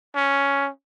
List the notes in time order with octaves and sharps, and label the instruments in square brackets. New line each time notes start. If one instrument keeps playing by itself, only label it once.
[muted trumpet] C#4